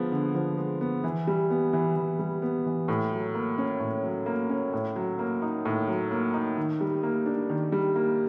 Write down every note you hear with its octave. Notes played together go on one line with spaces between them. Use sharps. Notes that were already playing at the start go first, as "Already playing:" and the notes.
Already playing: D3 F3 G#3 B3
D3
F3
G#3
B3
E3
G3
B3
E3
E3
G3
B3
E3
A2
F#3
A#3
C#4
A2
F#3
A#3
C#4
A2
F#3
A#3
D#4
A2
F#3
A#3
D#4
D#3
G3
A#3
D4
D#3
G3
A#3